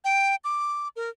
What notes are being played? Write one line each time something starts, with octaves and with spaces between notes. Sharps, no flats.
G5
D6
A#4